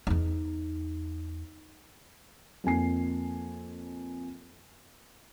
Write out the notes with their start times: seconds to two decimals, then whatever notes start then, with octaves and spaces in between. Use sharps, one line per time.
0.07 E2 D#4
2.64 F2 A#3 G#5 C7